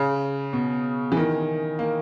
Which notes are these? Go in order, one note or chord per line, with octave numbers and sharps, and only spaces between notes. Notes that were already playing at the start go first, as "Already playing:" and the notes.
Already playing: C#3
B2
E3
D#3
A#3